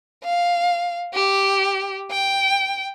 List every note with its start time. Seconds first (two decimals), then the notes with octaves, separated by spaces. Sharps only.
0.24 F5
1.13 G4
2.11 G5